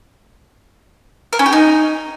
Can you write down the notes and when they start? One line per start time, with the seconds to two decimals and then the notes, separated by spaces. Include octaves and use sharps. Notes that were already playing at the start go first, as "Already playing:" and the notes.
1.33 A#4
1.39 C#4
1.46 G4
1.52 D#4